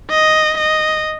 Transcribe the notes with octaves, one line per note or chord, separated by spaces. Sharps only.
D#5
D#5